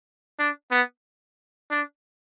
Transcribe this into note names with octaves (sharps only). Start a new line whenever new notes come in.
D4
B3
D4